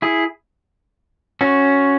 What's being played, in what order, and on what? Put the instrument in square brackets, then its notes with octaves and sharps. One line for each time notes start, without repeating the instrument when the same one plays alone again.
[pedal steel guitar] E4 G#4
C#4 F#4